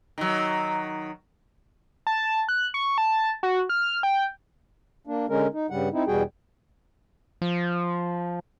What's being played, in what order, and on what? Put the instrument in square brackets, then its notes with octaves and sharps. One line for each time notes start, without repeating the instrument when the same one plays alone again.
[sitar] D#3 F#3
[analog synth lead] A5
F#6
C#6
A5
F#4
F6
G5
[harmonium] A#3 D4
D3 G#3 C#4 A#4
D#4
G2 C#3 G3 F#5
C4 D#4 E4
E2 B2 G3 F#4 G#4 G5
[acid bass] F3